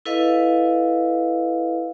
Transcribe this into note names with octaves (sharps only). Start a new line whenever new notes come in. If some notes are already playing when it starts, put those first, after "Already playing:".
E4 A4 B4 D#5 F5